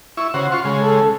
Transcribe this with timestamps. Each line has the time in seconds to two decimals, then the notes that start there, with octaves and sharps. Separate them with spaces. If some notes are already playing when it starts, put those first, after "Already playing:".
0.17 E4 C#6
0.34 C#3 F#4 C5
0.52 F4 C6 C#6
0.65 C#3 G#3
0.82 A4